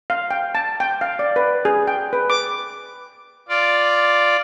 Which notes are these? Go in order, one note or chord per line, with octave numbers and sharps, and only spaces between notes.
F5
G5
A5
G5
F5
D5
B4
G#4
G5
B4
D6
F4 D5